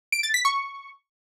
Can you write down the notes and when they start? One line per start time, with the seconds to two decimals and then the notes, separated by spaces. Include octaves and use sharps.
0.12 D7
0.23 A6
0.34 B6
0.45 C#6